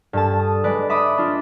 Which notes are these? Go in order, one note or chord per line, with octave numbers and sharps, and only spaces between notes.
G2 A4 A5
D#6
G#3 B4 D5
E5 B5 D6 D#6
D4 F4